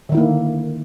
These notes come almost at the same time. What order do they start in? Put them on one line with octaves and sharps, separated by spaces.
D3 D#3 E4 A#3